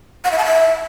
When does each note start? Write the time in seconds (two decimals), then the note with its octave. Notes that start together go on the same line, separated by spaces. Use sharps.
0.25 F#5
0.32 E5
0.38 A5
0.45 E5